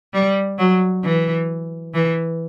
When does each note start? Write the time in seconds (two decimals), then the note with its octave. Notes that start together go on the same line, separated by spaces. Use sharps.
0.14 G3
0.59 F#3
1.04 E3
1.94 E3